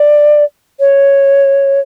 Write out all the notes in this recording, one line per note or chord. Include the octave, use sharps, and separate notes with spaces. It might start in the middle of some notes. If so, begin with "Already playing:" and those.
Already playing: D5
C#5